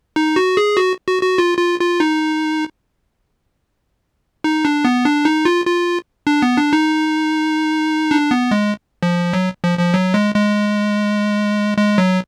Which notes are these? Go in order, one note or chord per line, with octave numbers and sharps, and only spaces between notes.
D#4
F#4
G#4
F#4
F#4
F#4
F4
F4
F4
D#4
D#4
D4
B3
D4
D#4
F4
F4
D4
B3
D4
D#4
D4
B3
G#3
F3
F#3
F3
F3
F#3
G#3
G#3
G#3
F#3